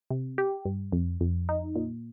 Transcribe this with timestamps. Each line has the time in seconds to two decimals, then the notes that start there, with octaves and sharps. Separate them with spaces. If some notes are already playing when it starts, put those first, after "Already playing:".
0.10 C3
0.38 G4
0.65 G2
0.92 F2
1.21 F2
1.49 D#4
1.76 A#2